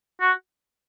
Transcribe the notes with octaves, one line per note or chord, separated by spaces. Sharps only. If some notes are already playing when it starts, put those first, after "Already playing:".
F#4